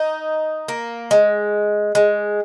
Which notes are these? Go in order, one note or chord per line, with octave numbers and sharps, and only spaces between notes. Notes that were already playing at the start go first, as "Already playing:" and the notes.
Already playing: D#4
A#3
G#3
G#3